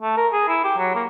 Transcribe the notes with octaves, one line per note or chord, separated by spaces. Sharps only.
A3
A#4
G#4
E4
G4
F#3
A#3